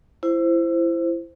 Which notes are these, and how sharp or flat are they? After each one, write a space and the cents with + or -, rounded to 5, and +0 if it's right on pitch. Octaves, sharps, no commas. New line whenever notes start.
E4 +25 C5 -5